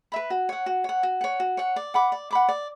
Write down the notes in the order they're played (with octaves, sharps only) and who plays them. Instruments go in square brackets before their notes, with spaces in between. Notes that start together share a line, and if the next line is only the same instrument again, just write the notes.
[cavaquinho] B4 E5 B5
F#4
C#5 F#5
F#4
C#5 F#5
F#4
C#5 F#5
F#4
C#5 F#5
D5
F#5 B5 D6
D5
F#5 B5 D6
D5